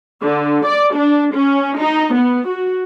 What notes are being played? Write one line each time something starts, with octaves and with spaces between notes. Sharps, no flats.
D3
D5
D4
C#4
D#4
B3
F#4